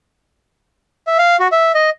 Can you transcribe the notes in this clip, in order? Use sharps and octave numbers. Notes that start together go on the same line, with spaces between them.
E5
F5
F#4
E5
D#5